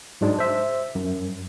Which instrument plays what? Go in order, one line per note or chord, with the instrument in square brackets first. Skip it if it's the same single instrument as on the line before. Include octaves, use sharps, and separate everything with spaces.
[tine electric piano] G#2 F#3 G#3 D4
C5 E5
F#2